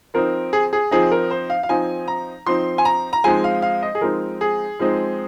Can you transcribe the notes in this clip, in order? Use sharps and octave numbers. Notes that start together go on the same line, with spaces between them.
F3 C4 D#4 A#4
G#4
G#4
F3 C4 D#4 G#4
A#4
C5
F5
F5
F3 C4 D#4 G#5
A#5
F3 C4 D#4 C6
G#5
A#5
A#5
F3 G#3 C4 D#4 G#5
F5
F5
D#5
G#4
F3 G#3 C4 D#4 A#4
G#4
F3 G#3 C4 D#4